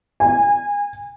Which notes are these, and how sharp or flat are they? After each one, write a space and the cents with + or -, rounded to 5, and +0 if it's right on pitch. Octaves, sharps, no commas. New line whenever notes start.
G#5 -25